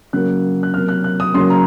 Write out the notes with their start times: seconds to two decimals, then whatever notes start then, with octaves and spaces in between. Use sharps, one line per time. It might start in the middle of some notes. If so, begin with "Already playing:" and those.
0.13 C#3 F#3 A#3 F#6
0.63 F#6
0.73 C3 F#3 A#3 F6
0.89 F#6
1.04 F#6
1.20 D#6
1.34 C#3 F#3 A#3 C6
1.50 A#5